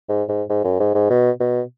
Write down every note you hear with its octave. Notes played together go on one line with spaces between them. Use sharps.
G#2
G#2
G#2
F#2
G#2
G#2
B2
B2